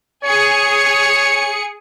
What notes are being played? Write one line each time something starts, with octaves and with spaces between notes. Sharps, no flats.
G#4 C#5 C#7